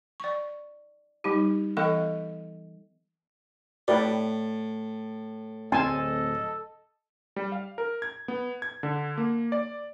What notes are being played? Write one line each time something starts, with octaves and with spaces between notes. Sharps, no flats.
D5 C#6
G3 D#4 G4
E3 B3 A4 D#5 F5 C#6
A2 G4 B4 D5
D1 C4 A4 D#5 G#5 A5 C6
G3
F5
A#4
G#6
B3
G#6
D3
A#3
D5